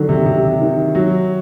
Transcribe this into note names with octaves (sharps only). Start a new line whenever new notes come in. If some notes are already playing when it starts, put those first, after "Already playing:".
Already playing: D3 D#3 F#3
C3
C3
D#3
F#3